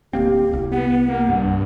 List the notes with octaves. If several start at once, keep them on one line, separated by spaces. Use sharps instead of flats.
D1 A#3 C4 G4
C2
B3 F#5
A#3
G2